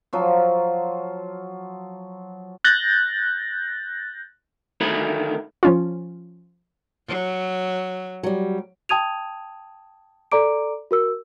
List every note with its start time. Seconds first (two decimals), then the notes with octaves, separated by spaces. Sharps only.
0.13 F3 F#3 F4
2.64 F#6 G6 A6 A#6
4.80 D2 D#3 A3 A#4 B5
5.63 F3 C#4 F4
7.07 F#3
8.23 F#3 G3
8.89 G5 A5 D#6 G#6 D#7 F7
10.32 A4 D5 A#5 D6 D7
10.91 F#4 A#4 E6